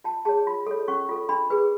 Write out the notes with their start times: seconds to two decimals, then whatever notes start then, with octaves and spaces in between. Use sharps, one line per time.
0.04 F4 A5
0.25 G#4 C#5 A5
0.47 F4 B5
0.67 A4 C#5
0.88 C#4 C#6
1.09 F4 A4
1.29 D4 B5
1.50 G#4 B4